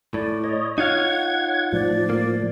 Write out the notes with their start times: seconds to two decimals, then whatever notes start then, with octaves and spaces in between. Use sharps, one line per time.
0.14 A2 D5
0.44 C#5 D#5
0.78 D#4 F4 C#5 F5 F#5 G#6
1.72 A2 F3 D5
2.10 A#3